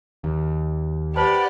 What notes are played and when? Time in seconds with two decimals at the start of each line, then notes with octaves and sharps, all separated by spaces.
0.24 D#2
1.16 G4 B4 C5 D5 F#5 A5